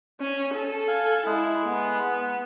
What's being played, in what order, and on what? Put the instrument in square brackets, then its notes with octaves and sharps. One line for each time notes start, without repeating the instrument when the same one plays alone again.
[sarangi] C#4
A4
[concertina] F5 G#5
[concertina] G#3 G#4 F#6 [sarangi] E4
[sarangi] B3